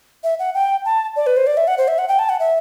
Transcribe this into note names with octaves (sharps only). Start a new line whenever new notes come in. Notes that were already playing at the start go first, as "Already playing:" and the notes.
E5
F#5
G5
A5
D5
B4
C5
D5
E5
F#5
C5
E5
F#5
G5
A5
F#5
E5